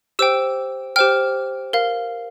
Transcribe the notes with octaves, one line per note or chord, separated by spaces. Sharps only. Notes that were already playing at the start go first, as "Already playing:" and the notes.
G4 C5 G5 E6
G4 C5 G5 F6
A#4 F5